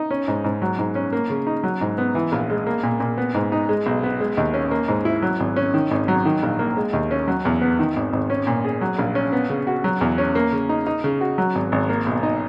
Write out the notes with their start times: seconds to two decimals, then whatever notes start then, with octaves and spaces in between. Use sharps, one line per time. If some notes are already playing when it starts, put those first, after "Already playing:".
Already playing: D#4
0.11 C#4
0.28 G#2
0.44 G#2
0.62 F#3
0.79 G#2
0.95 C#4
1.13 A#3
1.30 C#3
1.47 D#4
1.63 F#3
1.81 G#2
1.98 B3
2.15 E3
2.32 A#1
2.50 G#3
2.67 A#3
2.83 A#2
3.00 A#2
3.18 B3
3.35 G#2
3.52 D#4
3.69 G#3
3.86 B1
4.03 B3
4.20 G#3
4.37 D#2
4.54 C#4
4.71 A#3
4.88 G#2
5.05 E4
5.22 F#3
5.40 G#1
5.56 C#4
5.74 D#3
5.91 G#1
6.08 F#3
6.26 D#3
6.43 A#1
6.59 A#3
6.77 G#3
6.93 D#2
7.11 C#4
7.28 F#3
7.45 E2
7.61 B3
7.79 D#3
7.96 G#1
8.13 G#1
8.30 C#4
8.47 A#2
8.65 G#4
8.81 F#3
8.98 A#1
9.15 C#4
9.32 B3
9.50 C#3
9.67 F#4
9.84 F#3
10.01 E2
10.18 C#4
10.35 A#3
10.52 C#3
10.69 D#4
10.87 D#4
11.04 C#3
11.21 F#4
11.38 F#3
11.55 G#1
11.72 G#1
11.89 A#3
12.06 B1
12.23 D#4